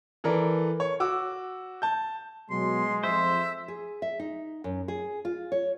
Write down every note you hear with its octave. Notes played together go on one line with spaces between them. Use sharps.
E3 A4 A#4 D5
C#5
F#4 D6 E6
A5 G6
B2 F#3 G#3 C6
F2 F3 C5 E5
G#4
E5
D#4
F#2
G#4
F4
C#5